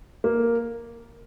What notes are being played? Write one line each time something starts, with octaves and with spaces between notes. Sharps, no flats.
A#3